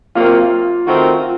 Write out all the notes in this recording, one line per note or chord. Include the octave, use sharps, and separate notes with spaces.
C3 F#3 A#3 F4
D#3 A3 C4 F#4 A#4
F4